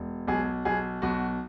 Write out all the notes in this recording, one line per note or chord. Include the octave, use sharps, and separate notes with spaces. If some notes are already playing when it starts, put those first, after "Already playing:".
Already playing: E1
B1 G#4
B1 G#4
B1 F#4